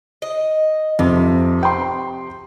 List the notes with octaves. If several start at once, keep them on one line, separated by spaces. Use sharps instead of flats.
D#5
F2 C3
G5 C6